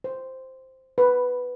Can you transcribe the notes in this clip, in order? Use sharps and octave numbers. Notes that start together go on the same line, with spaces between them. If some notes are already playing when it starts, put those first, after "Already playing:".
C5
B4